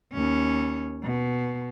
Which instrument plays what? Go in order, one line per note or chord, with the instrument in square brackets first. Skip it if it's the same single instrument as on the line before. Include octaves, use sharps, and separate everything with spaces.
[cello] D#2 C#4
B2